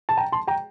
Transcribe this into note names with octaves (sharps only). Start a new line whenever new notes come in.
A5
G5 A#5
A5 C6
G5 A#5